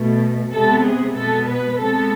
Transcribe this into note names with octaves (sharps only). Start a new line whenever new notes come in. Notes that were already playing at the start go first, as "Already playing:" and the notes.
Already playing: B2 A3
C3 G#3 B3 A4
G#4
B2 G#3 B3 A4
B4
C3 G#3 B3 A4